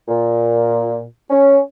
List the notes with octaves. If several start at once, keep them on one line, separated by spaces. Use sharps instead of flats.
A#2
C#4